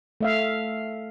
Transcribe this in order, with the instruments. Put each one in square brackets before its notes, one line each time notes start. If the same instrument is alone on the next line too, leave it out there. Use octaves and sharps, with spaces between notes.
[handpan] A3 E5 F5